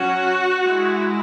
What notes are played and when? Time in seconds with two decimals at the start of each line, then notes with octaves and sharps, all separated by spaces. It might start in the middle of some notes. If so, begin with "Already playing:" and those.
Already playing: F#3 C#4 F#4
0.63 G#3 E4